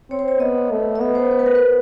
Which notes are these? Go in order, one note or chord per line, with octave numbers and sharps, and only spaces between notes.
C4 C#5
C5
C#5
B3 D#5
A3
D#5
B3 E5
C5
C5
B4
A#4
B4